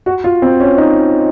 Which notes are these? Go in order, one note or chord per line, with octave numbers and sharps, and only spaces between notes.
F#4
F4
C4
C#4
D#4